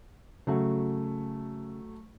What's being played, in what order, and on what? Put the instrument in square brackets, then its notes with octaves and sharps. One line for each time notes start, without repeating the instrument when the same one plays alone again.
[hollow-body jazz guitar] C#3 F#4 [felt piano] F#3 A3